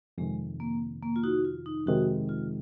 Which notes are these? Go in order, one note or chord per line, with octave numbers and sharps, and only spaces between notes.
F2 C3 D#3 G#3
A#3
A#3
F4
D#4 F#4
F4
D#4
F2 C3 D#3 G#3 D#4 F#4
F4